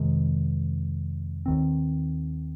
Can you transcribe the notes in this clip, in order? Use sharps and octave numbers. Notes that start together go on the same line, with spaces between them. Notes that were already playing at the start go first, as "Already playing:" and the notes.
Already playing: F2 C3 D#3 G#3
D#2 D#3 C4